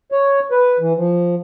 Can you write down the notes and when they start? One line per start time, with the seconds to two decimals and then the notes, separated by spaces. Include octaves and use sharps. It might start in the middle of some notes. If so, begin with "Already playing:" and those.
0.12 C#5
0.51 B4
0.80 E3
0.97 F3